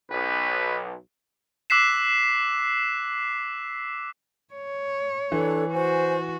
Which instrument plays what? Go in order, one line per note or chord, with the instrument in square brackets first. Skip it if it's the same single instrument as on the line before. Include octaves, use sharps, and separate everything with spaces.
[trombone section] B1 [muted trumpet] B4
[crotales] D6 E6 F#6 B6 C7 E7
[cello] C#5
[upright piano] E3 [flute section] D4 A4
[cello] F#4 [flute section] C5 G#5